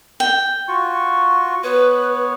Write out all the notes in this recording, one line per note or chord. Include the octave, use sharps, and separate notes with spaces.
G5
F4 F#4 C#6
B3 B4 C#5